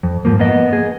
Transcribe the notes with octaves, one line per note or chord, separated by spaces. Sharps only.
F2
G#2 F3 A#3
A#3 B3 D#5
G#4